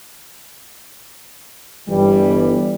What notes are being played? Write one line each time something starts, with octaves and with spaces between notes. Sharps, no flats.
G1 E3 G3